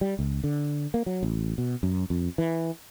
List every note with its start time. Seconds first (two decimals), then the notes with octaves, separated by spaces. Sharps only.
0.01 G3
0.19 C#2
0.44 D3
0.94 A#3
1.06 F#3
1.23 A1
1.58 B2
1.83 F#2
2.10 F2
2.38 E3